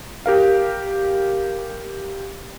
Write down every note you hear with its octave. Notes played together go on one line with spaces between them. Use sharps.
G4 A#4 F5